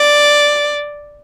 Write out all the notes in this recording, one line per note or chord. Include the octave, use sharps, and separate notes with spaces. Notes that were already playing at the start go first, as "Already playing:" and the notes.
Already playing: D5